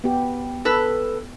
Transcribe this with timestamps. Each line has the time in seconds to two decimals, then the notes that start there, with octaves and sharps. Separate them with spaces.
0.04 B3 G4
0.65 A4 B4